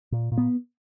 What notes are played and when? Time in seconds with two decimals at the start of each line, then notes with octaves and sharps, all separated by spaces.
0.12 A#2
0.32 A#2
0.38 B3